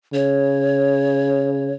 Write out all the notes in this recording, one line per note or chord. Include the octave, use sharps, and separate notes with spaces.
C#3 C#5